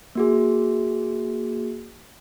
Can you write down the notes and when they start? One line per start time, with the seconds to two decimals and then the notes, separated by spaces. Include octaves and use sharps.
0.15 A#3 F#4 G#4